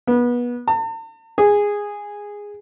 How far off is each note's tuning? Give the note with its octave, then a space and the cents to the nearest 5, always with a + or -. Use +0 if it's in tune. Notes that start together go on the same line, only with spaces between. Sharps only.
B3 -25
A5 +45
G#4 -10